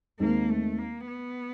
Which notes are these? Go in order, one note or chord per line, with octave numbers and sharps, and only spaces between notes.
D#2 D#3 G#3 A#3 C4
A3
A#3
B3